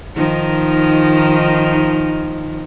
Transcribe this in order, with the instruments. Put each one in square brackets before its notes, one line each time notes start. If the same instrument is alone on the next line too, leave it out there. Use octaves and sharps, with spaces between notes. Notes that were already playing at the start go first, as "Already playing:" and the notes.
[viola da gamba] D#3 F3 D#4